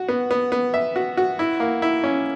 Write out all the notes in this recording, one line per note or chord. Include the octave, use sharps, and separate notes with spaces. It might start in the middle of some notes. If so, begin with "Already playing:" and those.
Already playing: F#4
B3
B3
B3
E5
F#4
F#4
E4
A#3
E4
C#4